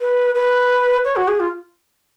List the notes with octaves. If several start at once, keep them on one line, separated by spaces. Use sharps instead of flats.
B4
B4
C#5
F#4
G#4
F4